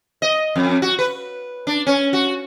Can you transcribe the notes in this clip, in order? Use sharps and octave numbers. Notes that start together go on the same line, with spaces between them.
D#5
F2
F#4
B4
D4
C#4
F#4